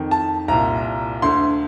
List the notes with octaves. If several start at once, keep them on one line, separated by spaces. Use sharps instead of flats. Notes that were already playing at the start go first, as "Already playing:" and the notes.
Already playing: F2 D#3
A5
C2 A#2 A#5
D2 D3 C6